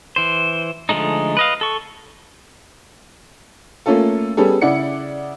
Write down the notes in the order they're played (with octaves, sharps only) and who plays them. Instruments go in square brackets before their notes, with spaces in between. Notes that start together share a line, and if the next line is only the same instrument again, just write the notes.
[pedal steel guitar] E3 C5
D3 F3 G#3 A3 D#4
B4 D#5 F5
A4 C#6
[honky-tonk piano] A3 A#3 C#4 F4 A4
G3 B3 C#4 G#4 A4
C#3 E4 D5 F#5 C#7